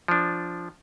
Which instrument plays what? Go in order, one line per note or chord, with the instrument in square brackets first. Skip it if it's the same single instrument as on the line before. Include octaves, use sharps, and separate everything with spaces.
[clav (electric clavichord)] F3 D4